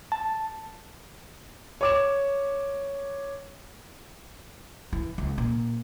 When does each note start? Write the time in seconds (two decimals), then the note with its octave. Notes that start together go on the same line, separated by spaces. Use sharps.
0.12 A5
1.81 C#5 D6 E7
4.93 E3
5.18 C#2
5.38 A#2